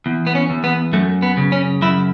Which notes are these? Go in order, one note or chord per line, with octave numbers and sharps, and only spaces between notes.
E2
B3
C#4
E2
B3
F#2 A3
B3
C#3
C#4
F#2 E4